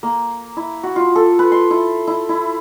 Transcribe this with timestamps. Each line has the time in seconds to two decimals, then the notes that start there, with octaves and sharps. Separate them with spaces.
0.03 A#3
0.57 E4
0.83 F#4
0.96 F4
1.16 A4
1.39 B4
1.52 C6
1.71 E4
2.07 E4
2.29 E4